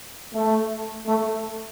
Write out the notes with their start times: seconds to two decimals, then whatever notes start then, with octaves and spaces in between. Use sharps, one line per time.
0.34 A3
1.07 A3